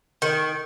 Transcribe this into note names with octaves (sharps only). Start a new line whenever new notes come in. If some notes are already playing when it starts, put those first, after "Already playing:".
D#3